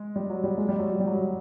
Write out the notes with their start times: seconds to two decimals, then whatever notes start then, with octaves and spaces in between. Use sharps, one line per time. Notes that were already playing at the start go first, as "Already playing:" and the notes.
Already playing: G#3
0.16 G3
0.30 F#3
0.44 G3
0.58 G#3
0.69 G3
0.79 F#3
0.90 F#3
1.00 G3
1.07 F#3
1.14 G3